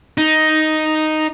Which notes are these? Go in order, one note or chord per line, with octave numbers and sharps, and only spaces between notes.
D#4